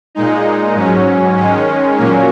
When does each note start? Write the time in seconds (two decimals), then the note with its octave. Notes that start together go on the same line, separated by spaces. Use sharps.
0.15 A#2 G#3 D#4
0.75 G#2 F#3 C#4
1.37 D#3 G#3 C#4
1.97 A#2 F#3 A#3 C#4